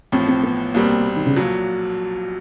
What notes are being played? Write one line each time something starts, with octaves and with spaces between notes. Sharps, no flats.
A1 A2 F3 C4
C4
B3
C2 B2 G3 A#3 C4
D#3
C#3
A#1 A#2 F#3